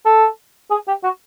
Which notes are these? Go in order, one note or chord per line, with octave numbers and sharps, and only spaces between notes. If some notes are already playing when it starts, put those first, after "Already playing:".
A4
G#4
G4
F#4